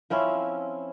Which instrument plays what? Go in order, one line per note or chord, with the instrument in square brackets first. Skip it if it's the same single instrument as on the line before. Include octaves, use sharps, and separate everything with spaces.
[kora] F3 C4 C#4 E4